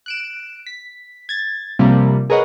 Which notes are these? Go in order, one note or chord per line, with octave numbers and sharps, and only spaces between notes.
F#6 D7 E7
B6
G#6 A6
C3 F3 G3 A#3
G#4 A#4 B4 C#5 D#5 F#5